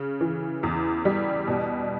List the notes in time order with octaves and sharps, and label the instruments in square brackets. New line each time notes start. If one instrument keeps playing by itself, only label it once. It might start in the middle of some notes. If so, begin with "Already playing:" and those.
Already playing: [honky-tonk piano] C#3
E3
E2
G3
B2